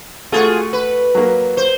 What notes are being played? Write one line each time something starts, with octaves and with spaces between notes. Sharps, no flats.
A3 F4 F#4 G#4
B4
F#3 A#3
C5